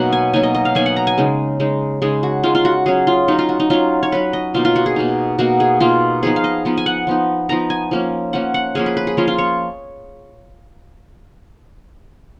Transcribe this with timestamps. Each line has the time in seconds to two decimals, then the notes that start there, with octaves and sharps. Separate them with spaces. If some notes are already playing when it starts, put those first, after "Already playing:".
Already playing: B2 F#3 A#3 D#4 F#5
0.12 G#5
0.33 B2 F#3 A#3 D#4 G#5
0.43 D#5
0.54 D#5
0.65 F5
0.75 B2 F#3 A#3 D#4 G#5
0.86 F#5
0.96 A#5
1.07 G#5
1.18 C#3 G#3 D#4
1.60 C#3 G#3 D#4
2.02 C#3 G#3 D#4 G#4
2.23 F#4
2.43 C#3 G#3 D#4 F4
2.55 F4
2.65 F#4
2.86 F#3 C#4 G#4
3.07 F4
3.28 F#3 C#4 D#4
3.39 F4
3.49 F#4
3.60 D#4
3.70 F#3 C#4 F4
4.03 C#5
4.12 F#3 C#4 B4
4.33 D#5
4.54 B2 A#3 D#4 F4
4.65 F4
4.76 F#4
4.86 G#4
4.96 B2 A#3 D#4
5.38 B2 A#3 D#4 F#4
5.60 G#4
5.80 B2 A#3 D#4 F4
6.23 F3 B3 D#4 G#4
6.36 F5
6.44 D#5
6.65 F3 B3 D#4
6.78 G#5
6.86 F#5
7.07 F3 B3 D#4
7.49 F3 B3 D#4 A#5
7.70 G#5
7.91 F3 A#3 C#4
8.33 F3 A#3 C#4 F#5
8.54 F#5
8.75 F3 A#3 C#4 G#4
8.86 B4
8.97 B4
9.07 G#4
9.17 F3 A#3 C#4 F4
9.28 F4
9.38 C#5